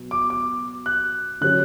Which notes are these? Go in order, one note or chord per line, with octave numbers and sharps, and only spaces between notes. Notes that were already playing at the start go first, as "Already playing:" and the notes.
Already playing: B2 F#3
D6
D6
F#6
D3 F#3 C#4 G4 F#6